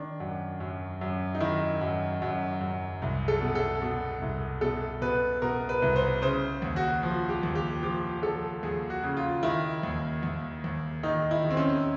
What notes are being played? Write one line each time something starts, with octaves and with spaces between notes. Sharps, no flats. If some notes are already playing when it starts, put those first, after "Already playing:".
Already playing: D#3 D4
F#2
F#2
F#2
D#4
D#3 E4
F#2
F#2
F#2
C2
A4
B2
A4
B2
C2
B2 A4
B2 B4
B2 A#4
B4
C2
C5
C#3 C5
D#2
F#4
F3
G4
D#2
G4
F3 G4
F3 A4
D#2 G#4
F#4
C#3
F4
D#3 E4
D#2
D#2
D#2
D#3 D#4
E4
D#3
C4
C#4